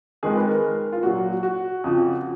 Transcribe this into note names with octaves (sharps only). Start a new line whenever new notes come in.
F2 D#3 G#3 G#4
B4
A#4
F4
A#2 F#3 F#4
F#4
F2 C#3 F3